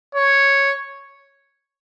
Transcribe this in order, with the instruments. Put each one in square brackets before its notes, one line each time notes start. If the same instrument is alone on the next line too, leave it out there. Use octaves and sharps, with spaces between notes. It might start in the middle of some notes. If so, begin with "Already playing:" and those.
[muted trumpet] C#5